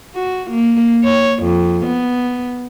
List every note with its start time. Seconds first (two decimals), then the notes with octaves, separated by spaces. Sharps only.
0.15 F#4
0.51 A#3
1.04 C#5
1.43 F2
1.86 B3